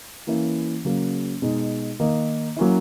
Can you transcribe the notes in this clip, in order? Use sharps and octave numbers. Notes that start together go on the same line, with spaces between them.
E3 A#3 C#4 E4
C#3 F#3 A#3
B2 G#3 D#4
D#3 A#3 D#4
F#3 A#3 C#4 E4